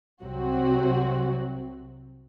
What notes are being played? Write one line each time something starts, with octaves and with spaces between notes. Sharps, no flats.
C2 C3 F#3 C4 F#4